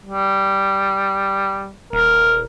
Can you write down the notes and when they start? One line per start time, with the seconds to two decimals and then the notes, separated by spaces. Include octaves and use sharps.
0.06 G3
1.93 D#1 A#4